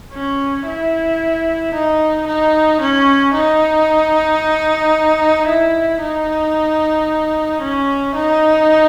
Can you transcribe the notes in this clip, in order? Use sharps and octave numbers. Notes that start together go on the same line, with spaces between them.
C#4
E4
D#4
D#4
C#4
D#4
E4
D#4
C#4
D#4